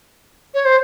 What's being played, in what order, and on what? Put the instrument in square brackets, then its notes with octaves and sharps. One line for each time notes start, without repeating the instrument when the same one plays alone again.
[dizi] C#5
C5